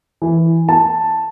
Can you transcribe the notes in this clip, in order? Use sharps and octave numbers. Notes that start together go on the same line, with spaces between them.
E3
A5